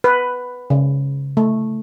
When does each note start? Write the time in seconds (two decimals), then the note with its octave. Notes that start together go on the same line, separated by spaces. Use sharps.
0.04 B4
0.70 C#3
1.37 A3